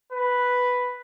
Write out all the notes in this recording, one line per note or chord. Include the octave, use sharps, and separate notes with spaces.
B4